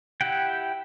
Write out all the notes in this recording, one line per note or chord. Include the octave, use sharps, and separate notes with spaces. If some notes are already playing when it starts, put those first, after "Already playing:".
E4 G4 F#5 G5